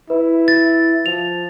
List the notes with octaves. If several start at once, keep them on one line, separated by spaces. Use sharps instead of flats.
E4 B4
A6
F3 F7